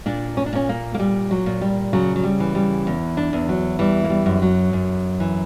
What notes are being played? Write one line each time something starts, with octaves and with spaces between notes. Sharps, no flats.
A#2 D4
C#4
D4
A#2 C#4
A#3
A#3
A#2 G3
F#3
A#2
G3
C#3 F#3
F#3
G3
E3
G3
E2
D4
E2
F#3
E3 G3
A#3
G3
F#2
F#3
F#2
E3